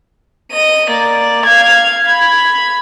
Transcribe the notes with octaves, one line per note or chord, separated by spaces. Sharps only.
D#5 D#7
A#3 D5
F5 G#6
B5 G#6